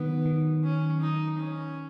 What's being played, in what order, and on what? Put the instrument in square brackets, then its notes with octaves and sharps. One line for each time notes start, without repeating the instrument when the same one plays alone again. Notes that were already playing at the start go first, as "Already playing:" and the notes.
Already playing: [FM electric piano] D#3 F#3 [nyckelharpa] B3
[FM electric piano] D#3
[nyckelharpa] C#4
D#4
C#4